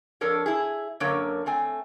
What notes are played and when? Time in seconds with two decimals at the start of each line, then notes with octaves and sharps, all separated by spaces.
0.21 F2 D4 A4 A#4 C#5
0.46 E4 G#4
1.00 F#2 D3 F#3 A#3 A#4 C#5
1.46 A3 C4 G#5